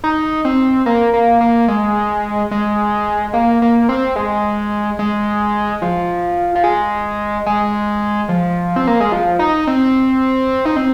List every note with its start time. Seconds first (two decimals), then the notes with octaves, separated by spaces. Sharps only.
0.04 D#4
0.45 C4
0.86 A#3
1.14 A#3
1.41 A#3
1.68 G#3
2.51 G#3
3.34 A#3
3.62 A#3
3.89 C4
4.16 G#3
4.99 G#3
5.82 F3
6.55 F3
6.64 G#3
7.46 G#3
8.29 F3
8.76 C4
8.87 A#3
9.00 G#3
9.12 F3
9.39 D#4
9.67 C4
10.65 D#4
10.76 C4